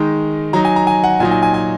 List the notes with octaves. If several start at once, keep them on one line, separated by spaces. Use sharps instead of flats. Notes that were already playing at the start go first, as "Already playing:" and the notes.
Already playing: D#3 G#3 D#4
F#3 D#4 A#5
G#5
A#5
G#5
F#5
A#2 F#3 D#4 G#5
G#5
G#5
G#5